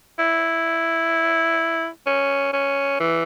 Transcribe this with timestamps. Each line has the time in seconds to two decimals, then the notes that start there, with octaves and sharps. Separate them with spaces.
0.19 E4
2.06 C#4
2.53 C#4
3.00 E3